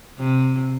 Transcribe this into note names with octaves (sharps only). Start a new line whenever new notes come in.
C3